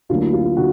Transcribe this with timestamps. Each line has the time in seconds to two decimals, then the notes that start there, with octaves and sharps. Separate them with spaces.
0.09 D2 D3 F#3 A#3 F4
0.21 E4
0.33 F4
0.44 F4
0.57 D3 F#4